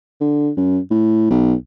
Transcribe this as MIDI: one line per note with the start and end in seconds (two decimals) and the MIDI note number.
0.21 0.50 50
0.56 0.78 42
0.90 1.28 45
1.30 1.53 35